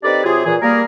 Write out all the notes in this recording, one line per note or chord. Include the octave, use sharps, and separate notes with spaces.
C4 D#4 G4 A4 B4 D5
C3 F#3 F4 G4 G#4
A#2 E3 G#4
G3 A#3 G#4 A#4